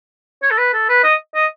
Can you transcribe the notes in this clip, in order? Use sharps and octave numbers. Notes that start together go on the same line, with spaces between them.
C#5
A4
B4
A4
B4
D#5
D#5